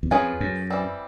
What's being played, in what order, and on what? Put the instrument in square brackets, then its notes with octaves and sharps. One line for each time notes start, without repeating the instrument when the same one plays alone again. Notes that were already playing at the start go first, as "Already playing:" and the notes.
[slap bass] E2
[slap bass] F2 [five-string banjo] C#4 F4 G#4 B4
[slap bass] F#2
[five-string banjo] E3 G3 C4